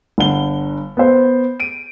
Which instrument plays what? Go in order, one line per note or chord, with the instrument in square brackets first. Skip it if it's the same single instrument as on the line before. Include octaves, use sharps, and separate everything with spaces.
[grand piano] G1 D3 F#5 G7
B3 C5
D7 D#7